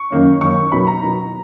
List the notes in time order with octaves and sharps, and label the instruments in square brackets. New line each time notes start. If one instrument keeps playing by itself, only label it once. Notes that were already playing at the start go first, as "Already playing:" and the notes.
Already playing: [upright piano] C#6
F#2 D#3 A#3 C#4
F#2 D#3 A#3 C#4 C#6
B2 F#3 B3 D#4 B5
A#5
B2 F#3 B3 D#4